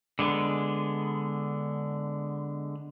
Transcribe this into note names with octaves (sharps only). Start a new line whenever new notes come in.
D3 G#3 B3